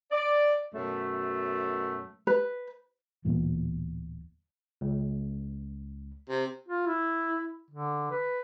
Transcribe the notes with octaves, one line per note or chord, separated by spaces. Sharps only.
D5
F#2 B2 A3
B4
D1 E2 A#2
C#2
C3
F4
E4
D3
B4